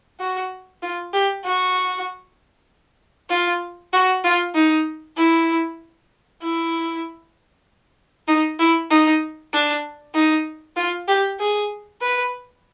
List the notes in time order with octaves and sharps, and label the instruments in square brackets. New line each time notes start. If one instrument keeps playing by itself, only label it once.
[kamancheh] F#4
F4
G4
F#4
F4
F#4
F4
D#4
E4
E4
D#4
E4
D#4
D4
D#4
F4
G4
G#4
B4